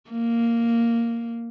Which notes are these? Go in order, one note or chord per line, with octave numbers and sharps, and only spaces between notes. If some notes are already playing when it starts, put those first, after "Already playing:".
A#3